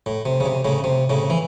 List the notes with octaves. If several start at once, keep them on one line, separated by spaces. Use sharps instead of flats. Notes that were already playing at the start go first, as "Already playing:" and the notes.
A2
C3
C#3
C3
A2 C#3
C3
A2 C#3
E3